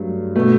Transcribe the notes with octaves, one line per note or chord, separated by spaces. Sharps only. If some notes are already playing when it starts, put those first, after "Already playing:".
Already playing: G2 F#3 A3
B2 A3